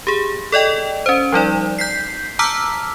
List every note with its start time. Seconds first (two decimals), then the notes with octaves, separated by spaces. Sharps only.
0.07 G4 G#4
0.52 A4 D5 D#5 G5
1.06 C#4 C5
1.32 F3 G3 D#4 D5
1.79 G6 B6 C7
2.39 A5 A#5 D6 E6 F6 B6